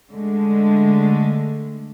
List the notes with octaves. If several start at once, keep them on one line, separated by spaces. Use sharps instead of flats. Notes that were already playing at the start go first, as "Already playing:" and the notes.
D3 G#3 A3